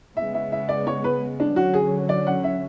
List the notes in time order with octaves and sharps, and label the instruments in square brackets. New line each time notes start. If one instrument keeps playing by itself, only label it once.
[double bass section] C#3 G#3 B3 [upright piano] E5
[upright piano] E5
E5
D5
C#5
B4
D4
[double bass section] D3 F#3 C#4 [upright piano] F#4
[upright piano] G#4
D5
F#5
E5